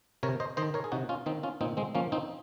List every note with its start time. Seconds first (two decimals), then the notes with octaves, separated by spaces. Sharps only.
0.23 C3 A#4 C#5
0.40 C5 D#5
0.57 D#3 C5 D#5
0.74 A#4 C#5
0.84 G#4
0.92 C3 D#4 F#4
1.09 C#4 F4
1.26 D#3 C4 D#4
1.43 C#4 F4
1.61 A#2 C4 D#4
1.77 G#3 C4
1.95 F3 A#3 C#4
2.12 C4 D#4